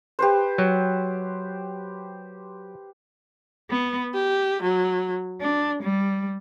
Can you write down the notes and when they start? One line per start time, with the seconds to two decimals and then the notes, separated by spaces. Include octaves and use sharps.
0.19 G4 B4 C5
0.58 F#3
3.69 B3
4.13 G4
4.63 F#3
5.40 D4
5.82 G3